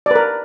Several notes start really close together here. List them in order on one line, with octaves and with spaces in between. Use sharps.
D5 B4 A#4